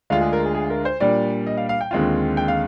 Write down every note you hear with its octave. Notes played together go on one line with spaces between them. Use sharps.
D2 D3 G#3 D4 F4 F5
G#4
A#4
G#4
G#4
A#4
C5
A#2 G3 D4 D5
D#5
F5
F5
G5
D#2 D3 G#3 C4 F4
G5
F5